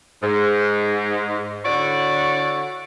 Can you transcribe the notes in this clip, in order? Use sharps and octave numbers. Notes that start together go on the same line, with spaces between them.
G#2
D3 E4 F#4 C#5 D5